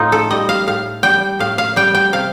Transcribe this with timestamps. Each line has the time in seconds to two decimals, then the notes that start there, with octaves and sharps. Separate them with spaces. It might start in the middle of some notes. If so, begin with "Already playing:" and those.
Already playing: A2 D#4 F4
0.12 A4
0.30 G3 D#5
0.49 F5
0.67 A2 F5
1.03 G3 G5
1.39 A2 F5
1.58 F5
1.76 G3 G5
1.95 G5
2.12 C3 F5